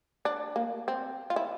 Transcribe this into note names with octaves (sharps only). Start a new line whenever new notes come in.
D4
A#3
C4
F4
E4